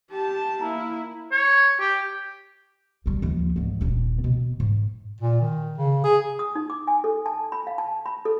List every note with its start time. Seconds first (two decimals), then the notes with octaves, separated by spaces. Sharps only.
0.11 G4 A5
0.61 A#3 E4 A#5
1.31 C#5
1.80 G4
3.06 B1 G3
3.22 D#2 F3
3.56 E2 G#2
3.81 D#1 D4
4.24 B2
4.60 G#2
5.20 A#2
5.41 D#3
5.78 C#3
6.04 G#4
6.39 D#6
6.55 D#4
6.70 D6
6.87 G#5
7.04 A4
7.26 A5
7.52 B5
7.67 F5
7.78 A5
8.06 B5
8.25 A4